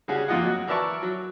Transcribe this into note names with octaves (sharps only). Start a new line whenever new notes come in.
C#3 G3 C#4 F#4 G#4
F2 A#3 F4 D#5 F#5
F#3 F#4
E3 A#4 D5 E5 A5 C#6
F#3